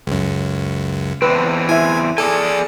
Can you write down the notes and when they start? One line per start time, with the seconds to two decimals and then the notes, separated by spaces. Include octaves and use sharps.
0.07 C#2 F#2
1.22 E2 E3 C4 B4
1.69 E4 E5 G#5
2.18 G#4 A4 D5 G#5